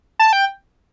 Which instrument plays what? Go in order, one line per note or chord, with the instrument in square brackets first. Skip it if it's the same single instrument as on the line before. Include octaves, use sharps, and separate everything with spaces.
[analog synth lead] A5
G5